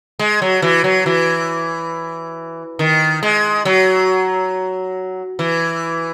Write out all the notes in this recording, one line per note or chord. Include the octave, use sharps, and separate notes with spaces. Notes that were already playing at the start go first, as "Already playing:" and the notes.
G#3
F#3
E3
F#3
E3
D#3
G#3
F#3
E3